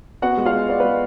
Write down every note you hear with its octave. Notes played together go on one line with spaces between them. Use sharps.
B3 F#4 F#5
G#3
F4 F5
G#3
B3 D5
B4
G#3